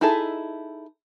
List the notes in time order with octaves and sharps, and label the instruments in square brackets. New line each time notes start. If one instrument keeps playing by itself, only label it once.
[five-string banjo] D#4 E4 G#4 A4 E5